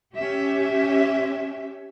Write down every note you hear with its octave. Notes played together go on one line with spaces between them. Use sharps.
C#4 G4 E5